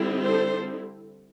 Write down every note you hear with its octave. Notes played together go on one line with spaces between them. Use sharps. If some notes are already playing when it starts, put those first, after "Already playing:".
Already playing: D3 G3 C4 E4
A4 C5